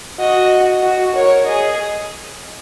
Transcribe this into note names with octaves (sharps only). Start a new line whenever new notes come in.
F#4 D#5
F#4
A#4 C#5
G#4 D#5